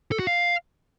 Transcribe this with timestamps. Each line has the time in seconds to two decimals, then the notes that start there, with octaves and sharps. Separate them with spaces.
0.12 A4
0.19 F#4
0.27 F5